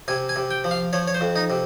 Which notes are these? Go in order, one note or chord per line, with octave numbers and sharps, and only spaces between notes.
C3 G#5
G#5
C3
G5
F3
F5
F3 C#5
C#5
C5
F2
D#4
C3